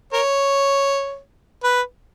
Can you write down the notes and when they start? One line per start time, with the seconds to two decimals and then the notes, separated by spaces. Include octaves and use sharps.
0.13 A#4 C#5
1.64 B4